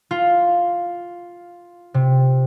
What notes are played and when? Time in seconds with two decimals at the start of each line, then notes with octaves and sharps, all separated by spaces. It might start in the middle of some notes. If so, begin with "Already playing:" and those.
0.11 F4
1.94 C3